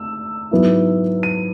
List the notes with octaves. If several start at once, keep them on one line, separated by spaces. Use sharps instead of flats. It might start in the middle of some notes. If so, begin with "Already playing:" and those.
Already playing: A3 E6
G#2 F#3 B3 E4
D#7